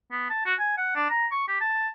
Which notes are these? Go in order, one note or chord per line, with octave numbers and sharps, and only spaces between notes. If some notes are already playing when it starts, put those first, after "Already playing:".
B3
A5
F#4
G#5
F#5
D4
A#5
C#6
G4
A5